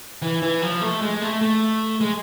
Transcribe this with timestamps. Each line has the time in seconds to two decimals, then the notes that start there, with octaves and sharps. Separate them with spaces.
0.22 E3
0.42 E3
0.62 F3
0.81 A3
1.02 G#3
1.22 A3
1.41 A3
2.01 G#3